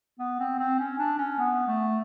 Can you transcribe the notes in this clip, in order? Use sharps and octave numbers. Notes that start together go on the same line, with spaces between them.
B3
C4
C4
C#4
D4
C#4
B3
A3